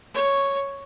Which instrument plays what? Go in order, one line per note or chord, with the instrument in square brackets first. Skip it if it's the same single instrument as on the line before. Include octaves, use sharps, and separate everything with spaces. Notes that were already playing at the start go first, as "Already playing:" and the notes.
[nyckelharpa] C#5